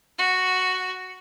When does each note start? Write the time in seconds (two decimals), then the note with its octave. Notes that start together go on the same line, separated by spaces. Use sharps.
0.18 F#4